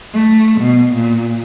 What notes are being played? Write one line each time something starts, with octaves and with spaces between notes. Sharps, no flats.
A3
B2
A#2